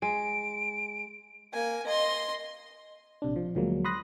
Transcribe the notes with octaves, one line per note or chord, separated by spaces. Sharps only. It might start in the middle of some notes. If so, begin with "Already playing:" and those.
G#3 D7
A#3 G#5
D#5 C6
A#1 C3 D4
F3
D2 F3 F#3 G#3 A#3
B5 C6 D#6 F#6 A#6